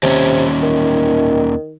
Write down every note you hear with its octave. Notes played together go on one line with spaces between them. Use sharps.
D#2 C3 C#4
D#3